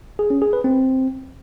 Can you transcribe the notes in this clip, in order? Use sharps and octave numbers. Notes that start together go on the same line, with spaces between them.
G#4
C#4
G#4
B4
C4